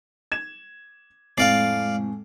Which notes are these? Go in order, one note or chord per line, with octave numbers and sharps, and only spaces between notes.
G#6 E7
F2 A2 G#3 C4 D5 F5